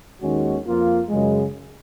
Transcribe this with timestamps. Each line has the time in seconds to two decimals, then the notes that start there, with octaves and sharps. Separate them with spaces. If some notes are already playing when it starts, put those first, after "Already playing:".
0.21 D#2 D#3 G#3 C#4 F#4
0.66 F2 F3 A#3 F4
1.09 F#2 C#3 G#3